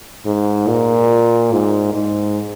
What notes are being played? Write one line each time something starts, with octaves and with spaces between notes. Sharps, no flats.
G#2
A#2
G#2
G#2